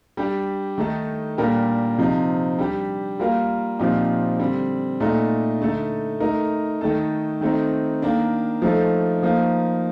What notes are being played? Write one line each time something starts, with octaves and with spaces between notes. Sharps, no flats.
G3 D4 G4
D#3 A3 D#4 A4
A#2 G3 D4 G4 A#4
C3 F3 C4 D#4
G3 D4 G4
G3 A#3 F4 A#4
A#2 F3 C4 D#4 G4
D3 G3 C4
A#2 A3 D#4
D3 A3 D#4 A4
A3 D#4 A#4
D#3 A3 D#4 A4
D#3 A3 C4 D#4
D#3 A#3 D4
F3 A3 D#4 A4
F3 A#3 D#4